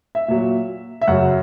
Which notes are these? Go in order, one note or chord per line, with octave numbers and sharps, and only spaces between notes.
E5
A#2 F#3
E5
F#2 C#3 F#3 F#5